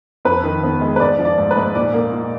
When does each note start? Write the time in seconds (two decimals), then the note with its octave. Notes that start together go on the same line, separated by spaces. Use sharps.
0.25 F2 B4
0.44 D#3
0.63 B3
0.81 G#3
0.96 B4
1.00 G#2 D5
1.19 F3
1.25 D5
1.38 G#2
1.51 B4
1.57 G#2
1.75 A#2 D5
1.94 A#3
2.12 A#2